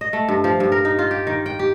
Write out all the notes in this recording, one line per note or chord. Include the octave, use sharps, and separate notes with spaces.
D#5
A3
G2
F3
G2
A#4
D#4
F4
G4
D#3
G5
G4